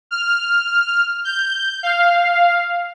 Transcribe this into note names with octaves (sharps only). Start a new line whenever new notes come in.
F6
G6
F5